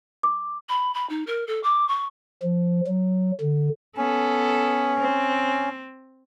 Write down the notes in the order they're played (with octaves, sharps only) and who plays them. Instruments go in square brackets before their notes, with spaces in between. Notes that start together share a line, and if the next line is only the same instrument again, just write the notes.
[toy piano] D6
[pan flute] B5
B5
D#4
A#4
A4
D6
C#6
[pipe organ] F3
F#3
D3
[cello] B3 A4 [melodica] C#4
[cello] C4